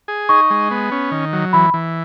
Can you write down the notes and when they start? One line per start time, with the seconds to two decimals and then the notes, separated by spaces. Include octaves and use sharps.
0.08 G#4
0.29 D#4 C#6
0.50 G#3
0.71 B3
0.91 C#4
1.12 D#3
1.33 F#3
1.53 E3 B5
1.74 E3